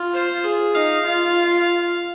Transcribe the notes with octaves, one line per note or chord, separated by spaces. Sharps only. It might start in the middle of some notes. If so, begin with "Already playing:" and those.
Already playing: F4
C5
G#4
D#4 F5
F4